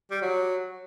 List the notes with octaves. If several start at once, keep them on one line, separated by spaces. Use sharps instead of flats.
G3
F#3